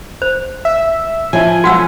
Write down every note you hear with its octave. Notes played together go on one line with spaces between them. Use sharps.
C5
E5
F3 C#4 E4 G#5
B1 F4 F#4 F#5 E6 C#7